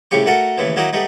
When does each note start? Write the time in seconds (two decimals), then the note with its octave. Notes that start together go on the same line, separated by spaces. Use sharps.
0.11 C2 A2 C#3 G4 C#6
0.26 A3 F#4 A4 A#4 F#5
0.58 D#2 A2 C#3 E3
0.76 D#3 F#3 A#3 D#4 E4 F#4
0.93 G3 A3 B3 D#4